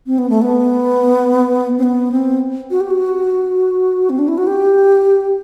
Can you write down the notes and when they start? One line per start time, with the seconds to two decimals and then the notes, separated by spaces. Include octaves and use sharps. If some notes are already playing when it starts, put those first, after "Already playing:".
0.07 C4
0.18 B3
0.30 A3
0.42 B3
1.78 C4
1.83 B3
2.12 C4
2.71 F#4
2.81 G4
2.90 F#4
4.10 C4
4.19 D4
4.28 E4
4.38 F#4
4.47 G4